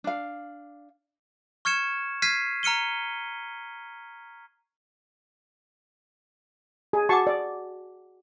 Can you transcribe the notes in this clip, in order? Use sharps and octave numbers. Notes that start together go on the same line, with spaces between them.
D4 F5
C#6 F6 G#6 C#7 E7
F6 G#6 B6 C7 D#7
A#5 F6 C#7 D#7 G7
G#4
F#4 F#5 A5 C#6 D6
D5